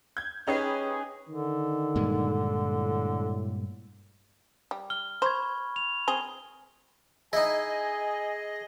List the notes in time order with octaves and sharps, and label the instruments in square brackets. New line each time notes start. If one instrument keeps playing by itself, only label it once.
[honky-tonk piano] G6 G#6
[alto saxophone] C#4 [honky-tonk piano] D#4 G4 B4 [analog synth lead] G#4
[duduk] D3 [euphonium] D#3
[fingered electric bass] G2 A#2 G#3
[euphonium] A2
[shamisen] G3
[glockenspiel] F6 G7
[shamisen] C5 [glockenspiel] B5 C#6 G#6
[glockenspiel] F7
[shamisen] C4 G#4 [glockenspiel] G7
[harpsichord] D#4 E4 [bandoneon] G#4 [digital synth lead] D#5 [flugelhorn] G#5